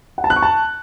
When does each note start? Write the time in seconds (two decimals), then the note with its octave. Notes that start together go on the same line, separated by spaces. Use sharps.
0.18 F#5
0.24 A5
0.30 F#6
0.36 C#6
0.42 A5